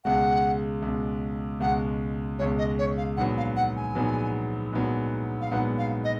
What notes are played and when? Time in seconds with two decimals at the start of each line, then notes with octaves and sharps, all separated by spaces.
0.05 C#2 B2 G#3 F#5
0.82 C#2 B2 G#3
1.60 C#2 B2 G#3 F#5
2.39 C#2 B2 G#3 C#5
2.58 D#5
2.79 C#5
2.97 F5
3.17 A#1 G#2 F#3 B3 F#5
3.37 F5
3.56 F#5
3.76 G#5
3.95 A#1 G#2 F#3 B3
4.73 A#1 G#2 F#3 B3
5.41 F5
5.51 A#1 G#2 F#3 B3 F#5
5.78 F5
6.04 D#5